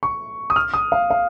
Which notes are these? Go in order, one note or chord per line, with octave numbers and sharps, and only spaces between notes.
C#6
D#6
F6
D#6
F5
F5